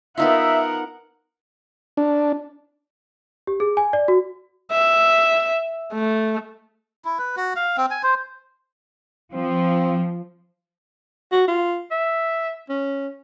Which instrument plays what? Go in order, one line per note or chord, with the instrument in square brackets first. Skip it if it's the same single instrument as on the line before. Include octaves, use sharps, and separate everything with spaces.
[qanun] B3 D#4 F4 [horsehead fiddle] A#4 F#5 [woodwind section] E5
[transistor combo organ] D4
[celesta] G4
G#4
G#5
D5
F#4
[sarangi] E5
A3
[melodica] E4
B4
F#4
F5
C4
G#5
C5
[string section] F3 [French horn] C4
[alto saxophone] F#4
F4
E5
C#4